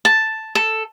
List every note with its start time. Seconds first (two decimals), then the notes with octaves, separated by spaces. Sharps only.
0.05 A5
0.55 A4